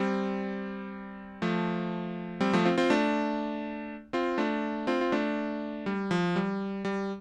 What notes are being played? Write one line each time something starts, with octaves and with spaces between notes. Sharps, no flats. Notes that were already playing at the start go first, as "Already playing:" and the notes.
Already playing: G3 C4
F3 A3
G3 C4
F3 A3
C4 F4
C4 F4
A3 D4
C4 F4
A3 D4
C4 F4
F4
A3 D4
G3
F3
G3
G3